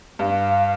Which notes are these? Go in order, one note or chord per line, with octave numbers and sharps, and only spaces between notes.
G2 F5